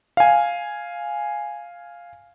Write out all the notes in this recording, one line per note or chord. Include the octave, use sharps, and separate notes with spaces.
F5 G#5